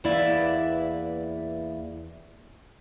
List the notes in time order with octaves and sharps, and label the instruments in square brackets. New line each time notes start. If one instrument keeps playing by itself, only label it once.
[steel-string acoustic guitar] E2 A#3 E4 B4 D5 E5